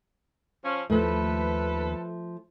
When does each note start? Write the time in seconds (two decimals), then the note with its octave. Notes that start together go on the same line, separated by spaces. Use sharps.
0.64 F3 C#4
0.90 D#2 F3 A3 A4 B4